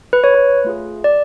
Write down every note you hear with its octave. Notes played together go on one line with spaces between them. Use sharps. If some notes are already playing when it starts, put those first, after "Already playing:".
B4
C#5
B4
A3 F4 G#4
D5